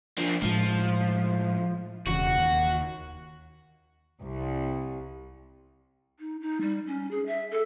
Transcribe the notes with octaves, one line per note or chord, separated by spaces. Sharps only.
F3 D4
A2 F3 G#3
E1 E2 C#3 F#4
D#2
C2
D#4
D#4
G3
C#4
G#4
E5
A4